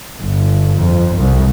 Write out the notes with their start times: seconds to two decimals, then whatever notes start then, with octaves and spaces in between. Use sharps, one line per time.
0.21 G1
0.79 F2
1.16 C2